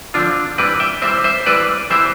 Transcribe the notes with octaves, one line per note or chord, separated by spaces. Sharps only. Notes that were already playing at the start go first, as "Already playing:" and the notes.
D3 F3 C4 D4 F4
E3 G3 C4 B4 D5
E5 G5
E3 G3 C4 C5 E5
C5 E5
E3 G3 C4 B4 D5
E3 G3 C4 C5 E5